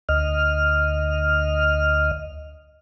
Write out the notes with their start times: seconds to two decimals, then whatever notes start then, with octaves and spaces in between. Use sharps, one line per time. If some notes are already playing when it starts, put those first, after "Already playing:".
0.09 D2 D#5 F6